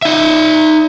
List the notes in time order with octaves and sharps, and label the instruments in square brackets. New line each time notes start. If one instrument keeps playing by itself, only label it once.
[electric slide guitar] D#4 E5